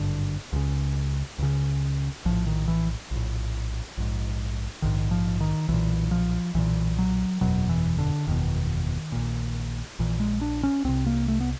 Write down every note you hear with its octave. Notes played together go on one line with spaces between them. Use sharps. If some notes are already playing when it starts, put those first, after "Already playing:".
Already playing: G#1 G2 D3
C#2 C#3
C#2 C#3
A#1 A2 F3
D#3
E3
A#1 A2
A#1 G#2
A#1 G#2 D#3
F3
D#3
B1 A#2 E3
F3
B1 A#2 E3
F#3
F#1 E2 B2 F#3
E3
D3
F#1 E2 B2 D#3
A#1 A#2
A#1 A#2 E3
G#3
D4
C#4
C2 C3 C4
A#3
A3
B3